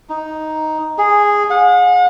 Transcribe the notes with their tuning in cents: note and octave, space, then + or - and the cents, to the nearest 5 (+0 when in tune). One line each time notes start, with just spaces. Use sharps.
D#4 +5
G#4 -10
F#5 -45